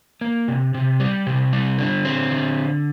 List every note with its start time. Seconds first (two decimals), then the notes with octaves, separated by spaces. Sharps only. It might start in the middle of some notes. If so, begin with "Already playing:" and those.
0.21 A#3
0.48 C3
0.74 C3
1.00 G3
1.27 C3
1.53 G3
1.78 D3
2.05 C4
2.31 D3